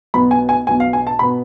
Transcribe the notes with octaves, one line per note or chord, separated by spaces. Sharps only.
B1 B2 B3 B5
G#5
G#5
B1 B2 B3 G#5
F5
G#5
A5
B2 B3 B5